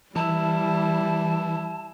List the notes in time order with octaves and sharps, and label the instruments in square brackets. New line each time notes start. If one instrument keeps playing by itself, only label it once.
[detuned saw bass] E3 [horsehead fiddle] G3 [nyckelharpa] E4 [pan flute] A5